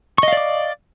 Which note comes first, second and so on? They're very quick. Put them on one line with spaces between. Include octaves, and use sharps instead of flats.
C#6 D#5 F5 D5 D6